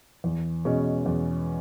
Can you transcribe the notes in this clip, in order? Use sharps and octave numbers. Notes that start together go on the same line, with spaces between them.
E2
B2 G#3 C#4
E2